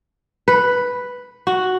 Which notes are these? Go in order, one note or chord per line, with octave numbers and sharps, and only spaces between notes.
B4
F#4